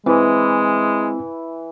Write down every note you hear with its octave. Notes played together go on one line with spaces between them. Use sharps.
E3 G#3 C4 E4 B4